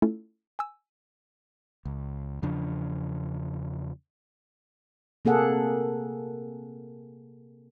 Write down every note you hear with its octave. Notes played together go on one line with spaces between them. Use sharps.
A3 C#4 E4 F4 A4
G#5 E6
C#2
E2 C#3 F3 D4
C3 A#3 G#4 A4 F#5